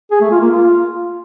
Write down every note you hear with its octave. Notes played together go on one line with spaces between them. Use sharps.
G#4
A3
F4
A#3
F4